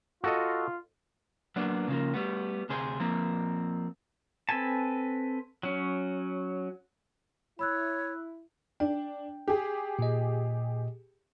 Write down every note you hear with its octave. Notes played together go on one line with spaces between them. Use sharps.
F4 F#4 A4 D#5
F#3 A#3 B3 D4 D5
C#3 F3 A#3
G3 A3 B3
D2 C3 G#4 C5
F3 A#3 C4
C4 A4 B4 G#5 A5
F#3 C#4
E4 C#5 B5 E6 F#6
D4 G5
G4 G#4
A#2 D#5